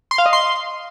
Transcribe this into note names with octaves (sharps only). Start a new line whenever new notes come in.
C6
F5
D#5
C6